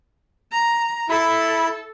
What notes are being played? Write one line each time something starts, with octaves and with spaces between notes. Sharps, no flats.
A#5
E4 A4 B5